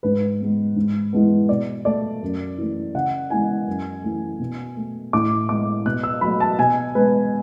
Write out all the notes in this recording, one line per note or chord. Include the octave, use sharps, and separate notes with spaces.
G#2 B4
G#3 B3
G#2
E3 G#3 B3
B2 D5
A3 D5
F#2
E3 A3
C#3 F#5
E3 G#3 B3 G#5
F#2
E3 A3
B2
A3
A2 D6
G#3 B3 D6
B2 F#6
E6
F#3 A3 B5
A5
B2 G#5
G#3 B3 B4